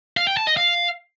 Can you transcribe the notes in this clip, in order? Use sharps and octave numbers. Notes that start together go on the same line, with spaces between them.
F5
G5
A5
D#5
F5